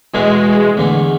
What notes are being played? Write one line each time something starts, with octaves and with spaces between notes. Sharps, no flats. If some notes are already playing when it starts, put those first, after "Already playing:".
E2 B2 G#3 A3 E4
E2 D3 A3